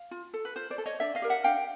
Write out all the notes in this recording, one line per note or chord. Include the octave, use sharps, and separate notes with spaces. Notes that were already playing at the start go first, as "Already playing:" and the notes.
Already playing: F5
F4
A4
B4
F4 C5
C5 D5
A4
C#5 D#5
D4 D5 E5
D#5 F5
G4 A#4
E5 F#5
D4 F5 G5